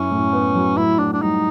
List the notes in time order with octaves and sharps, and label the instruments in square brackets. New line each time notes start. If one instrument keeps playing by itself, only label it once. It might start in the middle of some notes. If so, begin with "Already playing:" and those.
Already playing: [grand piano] F#2 E4 [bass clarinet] C#4
[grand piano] A2
B3
F#3
[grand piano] A2 [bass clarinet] E4
[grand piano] A2 [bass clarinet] D4
[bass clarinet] D4
[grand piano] G3 [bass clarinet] D#4